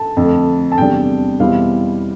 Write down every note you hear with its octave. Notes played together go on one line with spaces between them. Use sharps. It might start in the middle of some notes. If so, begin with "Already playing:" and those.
Already playing: A5
F2 D3 A3
A5
E2 C3 G3 D4 G5
E2 B2 G3 C4 E4 F5